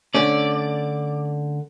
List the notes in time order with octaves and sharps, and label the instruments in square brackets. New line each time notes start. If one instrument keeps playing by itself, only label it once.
[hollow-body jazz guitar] D3 A3 C#4 [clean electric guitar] D5